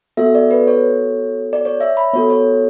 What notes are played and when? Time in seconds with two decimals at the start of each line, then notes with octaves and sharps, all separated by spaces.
0.17 B3 F#4 A4 E5
0.35 D5
0.51 B4
0.67 C#5
1.53 D5
1.65 C#5
1.81 E5
1.97 B5
2.13 B3 F#4 A4 C#5
2.30 C#5